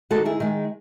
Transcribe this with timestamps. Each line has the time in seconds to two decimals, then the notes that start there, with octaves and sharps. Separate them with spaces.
0.10 D#3 G#3 F#4 A4
0.25 E4 G#4
0.40 D#3 G#3